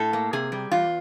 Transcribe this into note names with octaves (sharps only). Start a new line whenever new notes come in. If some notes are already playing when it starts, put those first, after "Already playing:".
Already playing: A2 A4
A#3
C3 G#4
G3
E2 F4